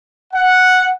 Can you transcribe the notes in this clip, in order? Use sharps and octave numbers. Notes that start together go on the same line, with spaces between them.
F#5